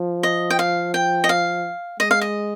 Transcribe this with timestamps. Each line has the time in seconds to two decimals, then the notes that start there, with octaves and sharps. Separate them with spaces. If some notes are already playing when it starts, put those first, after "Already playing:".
Already playing: F3
0.23 D#5
0.50 G5
0.59 F5
0.94 G5
1.24 D#5
1.29 F5
2.00 G#3 D#5
2.11 F5
2.21 D#5